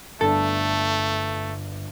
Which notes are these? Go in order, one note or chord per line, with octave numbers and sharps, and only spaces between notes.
G1 A3 D4 A4